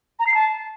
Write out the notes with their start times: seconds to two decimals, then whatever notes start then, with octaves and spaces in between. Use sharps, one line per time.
0.19 A#5
0.27 C7
0.34 A5